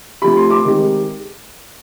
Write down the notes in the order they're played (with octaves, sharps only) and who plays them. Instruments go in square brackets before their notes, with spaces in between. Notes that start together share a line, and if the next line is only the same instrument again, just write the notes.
[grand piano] C3 F3 A3 B5
C6
D6
C3 D#3 G#3